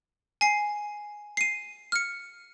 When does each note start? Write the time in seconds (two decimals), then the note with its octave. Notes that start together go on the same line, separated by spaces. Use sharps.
0.41 G#5 C7
1.37 C7 D#7
1.92 F6 C#7